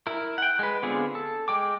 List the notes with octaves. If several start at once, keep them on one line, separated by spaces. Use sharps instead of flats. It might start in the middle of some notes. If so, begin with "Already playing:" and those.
E4 A#4
F#5 G5
G#3 B4
D3 B3 C4 F4 G#4
A4
G#3 G5 D6